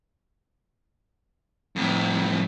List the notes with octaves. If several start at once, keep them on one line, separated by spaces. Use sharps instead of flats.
F2 A2